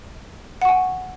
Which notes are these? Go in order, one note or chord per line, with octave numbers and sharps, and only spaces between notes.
F#5 G#5 C#6